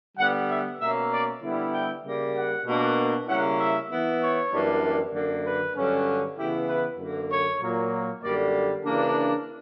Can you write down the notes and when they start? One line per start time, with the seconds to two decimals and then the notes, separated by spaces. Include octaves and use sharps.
0.18 D3 G3 B3 F#5
0.49 E5
0.80 B2 A#3 C#4 E5
1.11 D5
1.42 D3 G3 B3 E4
1.72 G5
2.04 C#3 G3 A#3
2.35 F#5
2.66 B2 A#3 D4
3.27 C#3 G3 A#3 C#4 E4 F#5
3.58 E5
3.90 E3 B3 E4
4.21 C#5
4.51 F#2 E3 G3 A#3 D4
5.13 F#2 D3 A#3
5.45 B4
5.75 G2 D3 F#3 C#4
6.37 C#3 E3 B3 E4 G4
6.68 B4
6.99 F#2 D3 A#3
7.29 C#5
7.61 A#2 F#3 A#3
8.23 F#2 D3 G3 A#3 D5
8.84 C#3 E3 A#3 D4